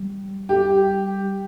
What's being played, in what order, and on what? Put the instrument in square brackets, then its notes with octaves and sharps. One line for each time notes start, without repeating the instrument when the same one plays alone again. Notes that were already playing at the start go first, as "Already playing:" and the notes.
Already playing: [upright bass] G3
[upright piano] G4